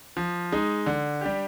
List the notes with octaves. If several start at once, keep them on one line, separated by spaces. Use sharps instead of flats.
F3
G#3 D#4
D3
G3 D4 G4